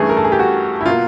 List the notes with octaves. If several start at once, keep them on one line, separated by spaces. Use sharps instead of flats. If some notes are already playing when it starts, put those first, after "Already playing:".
Already playing: G2 E3 A3 C#4 G#4
A#4
A4
G#4
G4
F#4
E4
B2 F#3 A#3 F4